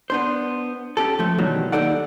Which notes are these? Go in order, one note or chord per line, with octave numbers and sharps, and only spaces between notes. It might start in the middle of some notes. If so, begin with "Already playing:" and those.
B3 D4 C5
C#4 G4 A4
F3 A3
B2 D#3 E3 F#3 G3
D#2 C#3 D#4 A4 D5 F#5